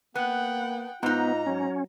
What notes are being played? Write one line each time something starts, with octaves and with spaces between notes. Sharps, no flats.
A#3 B3 F#5 G5
G#2 B3 D#4 F4 A#5
F#3 C#4